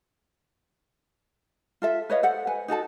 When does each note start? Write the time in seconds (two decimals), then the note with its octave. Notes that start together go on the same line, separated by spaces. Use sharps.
1.82 F4 A4 E5
2.10 B4 C#5 D#5 F5
2.23 A4 C5 F#5
2.47 B4 G#5
2.68 D#4 F#4 A4 A5